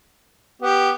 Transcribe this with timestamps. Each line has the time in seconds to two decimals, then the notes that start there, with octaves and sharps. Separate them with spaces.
0.62 B3 G4